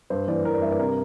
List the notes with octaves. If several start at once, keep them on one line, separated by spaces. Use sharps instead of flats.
G2 C5
E3 D5
E3 A#4
D5
G2 E5
D5
C3 A#4